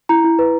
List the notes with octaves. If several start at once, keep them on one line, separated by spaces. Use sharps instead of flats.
E4 A#5
E4
B4